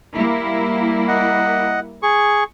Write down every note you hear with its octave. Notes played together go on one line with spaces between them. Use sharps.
G3 A#3 E4
D#5 F#5
G#4 C#6